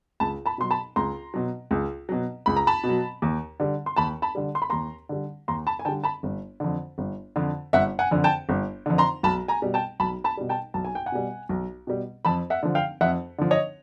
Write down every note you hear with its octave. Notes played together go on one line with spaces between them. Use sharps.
C#2 A5 B5
A5 B5
B2 F#3 C6
A5 B5
C#2 A#5 C6
B2 F#3
C#2
B2 F#3
C#2 B5
A#5
A5 B5
B2
F#3
D#2
D3 G3
C6
D#2 A5 B5
A5 B5
D3 G3
C6
B5
D#2 A#5 C6
D3 G3
D#2 A#5 C6
A5 B5
G#5
D3 G3 G5 A5
A5 B5
G1
F2 D3
G1
F2 D3
G1 E5 F#5
F#5 G#5
F2 D3
G5 A5
G1
F2 D3
A#5 C6
B1 A5 B5
G#5 A#5
B2 G3
G5 A5
B1 A5 B5
A5 B5
B2 G3
G5 A5
B1 A5
G#5
G5
F#5 G#5
B2 G3
B1
B2 G3
F2 A5 B5
E5 F#5
D3 F3
F5 G5
F2 E5 F#5
D3 F3
C#5 D#5